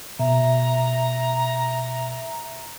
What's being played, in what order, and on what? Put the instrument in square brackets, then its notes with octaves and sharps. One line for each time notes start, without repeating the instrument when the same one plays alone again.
[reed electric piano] B2 [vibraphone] E5 [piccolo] A#5